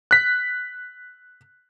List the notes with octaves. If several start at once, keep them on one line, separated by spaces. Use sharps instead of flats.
F#6 B6